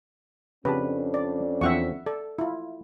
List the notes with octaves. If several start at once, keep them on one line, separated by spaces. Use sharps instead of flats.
F2 C#3 C#4 D4 G4 B4 A5
D5
E2 F3 C4 E5 F#5 C#6
A4 D5
E4 F4